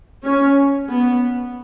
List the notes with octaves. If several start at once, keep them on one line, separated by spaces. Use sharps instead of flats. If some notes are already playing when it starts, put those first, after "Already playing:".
C#4
B3